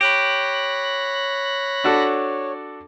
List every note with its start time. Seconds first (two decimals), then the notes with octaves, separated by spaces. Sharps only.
0.01 G4 C#5 B5 F#6 A#6
1.84 D4 F#4 A4